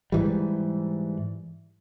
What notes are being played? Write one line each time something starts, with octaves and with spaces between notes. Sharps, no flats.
G#2 E3 G3